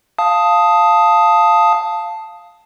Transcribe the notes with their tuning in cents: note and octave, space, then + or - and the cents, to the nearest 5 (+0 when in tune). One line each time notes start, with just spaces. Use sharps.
F5 +0 A5 +0 D#6 +5